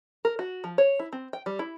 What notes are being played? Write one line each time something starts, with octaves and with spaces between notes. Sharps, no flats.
A#4
F#4
F3
C#5
E4
C4
G5
G3
E4